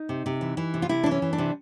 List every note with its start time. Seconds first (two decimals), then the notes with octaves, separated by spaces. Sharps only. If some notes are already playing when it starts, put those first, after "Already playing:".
Already playing: D#4
0.09 C3
0.26 C3
0.41 E3
0.57 E3
0.74 C3
0.82 F4
0.89 C3 E4
1.03 D4
1.06 E3
1.11 C#4
1.22 E3
1.33 D4
1.38 C3